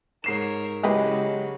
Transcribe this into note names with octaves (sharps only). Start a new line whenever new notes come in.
G#2 A#4 C#5 C7 E7
C#3 F#3 G#3 B3 E4 G4 B4